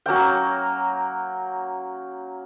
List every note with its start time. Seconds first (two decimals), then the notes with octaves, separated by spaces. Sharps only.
0.06 F#3 A#3 C#4 G5